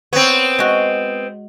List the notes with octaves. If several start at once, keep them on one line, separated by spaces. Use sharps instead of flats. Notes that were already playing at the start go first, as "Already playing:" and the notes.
B3 C4 C#5
G#3 F#4